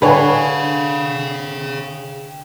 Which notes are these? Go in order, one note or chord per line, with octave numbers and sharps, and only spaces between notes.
D3 G#4 B4 C#5 F5 G5 G#5